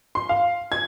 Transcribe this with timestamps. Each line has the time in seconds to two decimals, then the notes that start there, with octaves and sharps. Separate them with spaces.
0.15 C6
0.29 F5
0.72 G#6